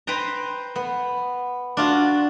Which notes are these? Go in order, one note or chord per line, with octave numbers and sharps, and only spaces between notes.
B4 C5 G5 A#5
B3
D4 F4 F#4